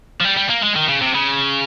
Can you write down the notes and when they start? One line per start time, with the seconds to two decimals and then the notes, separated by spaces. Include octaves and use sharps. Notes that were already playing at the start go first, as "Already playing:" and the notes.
0.21 F3
0.25 G3
0.37 G3
0.50 A#3
0.63 G#3
0.76 D#3
0.88 C#3
1.01 C3
1.14 C#3